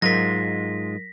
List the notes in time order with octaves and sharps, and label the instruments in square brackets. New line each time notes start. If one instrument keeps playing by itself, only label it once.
[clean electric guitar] G#2 G#3 F4 [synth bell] F#3 A#4 [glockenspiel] A#6 B6